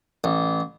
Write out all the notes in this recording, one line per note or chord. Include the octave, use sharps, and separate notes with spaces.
A1